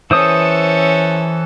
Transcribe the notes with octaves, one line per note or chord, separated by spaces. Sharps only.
E3 C#4 A4 C5 D#6